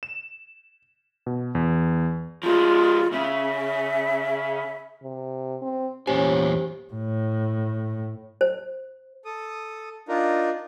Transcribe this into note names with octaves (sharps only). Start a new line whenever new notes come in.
E7
B2
E2
F3 G#3 F4
C#3 E5
C3
C4
E2 A#2 C#4 G4 C5 G#5
A2
C5
A4 D#6
D4 D#4 F4 A#4